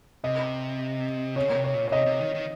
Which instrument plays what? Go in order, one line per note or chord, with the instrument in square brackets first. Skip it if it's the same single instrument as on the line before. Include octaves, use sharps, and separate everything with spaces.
[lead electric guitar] C3 [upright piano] D#5
[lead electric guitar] C#3 [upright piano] C#5
[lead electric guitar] A#2
C3
[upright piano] C#5
[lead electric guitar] A#2
[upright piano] C#5
[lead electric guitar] C3 [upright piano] D#5
[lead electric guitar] C3
D#3
D#3